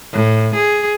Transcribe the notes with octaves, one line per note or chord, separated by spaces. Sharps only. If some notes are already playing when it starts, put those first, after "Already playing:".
A2
G#4